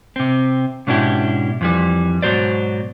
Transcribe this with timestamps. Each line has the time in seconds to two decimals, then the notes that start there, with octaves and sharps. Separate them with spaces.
0.16 C3 C4
0.87 G#2 B2 C#4 D4 E4 G4
1.61 F2 E3 G3
2.22 G#2 B2 F#3 C5 D5